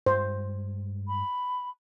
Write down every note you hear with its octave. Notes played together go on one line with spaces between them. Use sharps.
G2 G#3 C5
B5